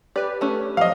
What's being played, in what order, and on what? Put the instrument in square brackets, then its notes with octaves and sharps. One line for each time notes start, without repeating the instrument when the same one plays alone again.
[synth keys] G4 B4 [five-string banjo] D5
[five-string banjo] A3 C#4
[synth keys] F3 F#3 [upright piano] D#5 F5